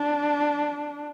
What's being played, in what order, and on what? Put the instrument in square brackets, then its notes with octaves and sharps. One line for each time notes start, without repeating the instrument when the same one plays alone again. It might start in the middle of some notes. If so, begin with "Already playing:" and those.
Already playing: [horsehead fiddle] D4